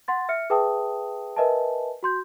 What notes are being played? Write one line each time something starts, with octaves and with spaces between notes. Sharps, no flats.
F#5 C6 A6
E5 F6 C#7
G#4 B4 E5 G5 A5 D#6
A#4 B4 D#5 E5 G#5 A5
F#4 C6 G6